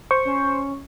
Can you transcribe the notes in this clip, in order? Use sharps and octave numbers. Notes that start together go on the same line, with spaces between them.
C5 C#6
C#4